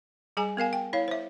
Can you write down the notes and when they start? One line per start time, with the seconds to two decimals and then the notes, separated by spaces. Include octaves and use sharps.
0.37 G3 G#4 G#5 A#5
0.57 B3 A#4 F5 G#5
0.73 G5
0.93 E4 C#5 F5
1.08 C5 E5